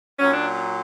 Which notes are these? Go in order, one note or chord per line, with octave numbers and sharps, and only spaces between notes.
A#2 F#3 C#4
D4